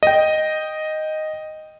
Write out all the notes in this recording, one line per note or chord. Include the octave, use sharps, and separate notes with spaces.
D#5 G5